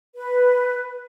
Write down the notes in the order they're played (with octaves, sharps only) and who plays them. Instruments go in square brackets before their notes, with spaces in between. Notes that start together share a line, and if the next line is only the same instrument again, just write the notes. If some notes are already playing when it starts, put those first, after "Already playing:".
[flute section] B4